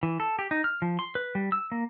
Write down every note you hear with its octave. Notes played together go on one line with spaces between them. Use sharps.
E3
A4
G4
D#4
F6
F3
C6
B4
G3
E6
A#3